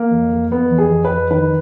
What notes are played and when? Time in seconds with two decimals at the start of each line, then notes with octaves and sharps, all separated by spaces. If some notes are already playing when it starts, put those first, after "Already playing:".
Already playing: A#3
0.11 F2
0.31 F2
0.52 F2 B3
0.71 F2
0.78 G#4
0.91 F2
1.05 B4
1.11 F2
1.31 D#3 B4